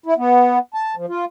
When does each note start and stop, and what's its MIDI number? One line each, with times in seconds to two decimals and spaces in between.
0.06 0.14 64
0.18 0.59 59
0.74 0.95 81
0.96 1.06 53
1.08 1.25 65